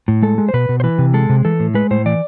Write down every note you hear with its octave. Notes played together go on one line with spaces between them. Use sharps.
A2
G#3 A4
G#3
C5
B2 B4
B2
C5
E3 B4
C3
G#3 A4
C3
E3 A4
A2
G#3 B4
A2 C5
E3 D5